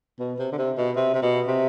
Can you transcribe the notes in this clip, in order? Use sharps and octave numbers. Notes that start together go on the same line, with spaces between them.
B2
C3
D3
C3
B2
C3
C3
B2
C3